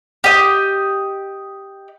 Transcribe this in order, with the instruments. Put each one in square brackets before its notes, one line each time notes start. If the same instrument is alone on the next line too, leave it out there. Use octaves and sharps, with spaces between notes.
[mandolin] G4 D#5